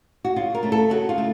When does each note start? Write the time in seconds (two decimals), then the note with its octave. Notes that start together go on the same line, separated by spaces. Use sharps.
0.24 F#4
0.36 C#3 F4
0.55 A#4
0.63 A3 C#4
0.72 A4
0.90 C#3 F#4
1.09 F4
1.18 A3